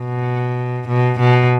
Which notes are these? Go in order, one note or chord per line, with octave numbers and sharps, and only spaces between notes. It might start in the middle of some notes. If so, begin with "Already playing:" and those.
Already playing: B2
B2
B2